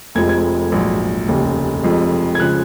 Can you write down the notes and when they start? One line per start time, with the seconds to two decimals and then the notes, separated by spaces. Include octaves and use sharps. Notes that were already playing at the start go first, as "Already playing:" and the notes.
0.15 F1 F2 F3 G#3 G#6
0.29 G#6
0.72 A#1 G#2 F#3
1.28 F1 D#2 C#3
1.83 F1 F2 F3 G#3
2.35 G#6
2.40 C#3 F3 G#3 F#6